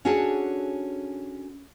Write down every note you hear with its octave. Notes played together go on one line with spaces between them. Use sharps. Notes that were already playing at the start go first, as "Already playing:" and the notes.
C#4 D4 F#4 G#4 A4 C#5